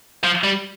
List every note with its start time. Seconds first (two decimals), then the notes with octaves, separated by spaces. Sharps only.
0.24 F3
0.44 G3